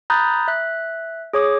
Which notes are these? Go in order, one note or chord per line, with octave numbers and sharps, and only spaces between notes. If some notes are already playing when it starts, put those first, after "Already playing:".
A#5 B5 D#6 F#6 G6 A6
E5 F#6
G#4 C#5 D6 D#6